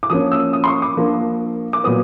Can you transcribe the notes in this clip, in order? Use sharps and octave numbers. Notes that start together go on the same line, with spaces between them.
D6
F3 A#3 C#4 D#6
E6
D#6
C6
C#6
D6
F3 A#3 D4
D6
A#2 F#3 B3 D#6